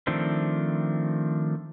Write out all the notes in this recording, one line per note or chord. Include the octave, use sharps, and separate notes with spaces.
D#3 F3 A3 C4 D4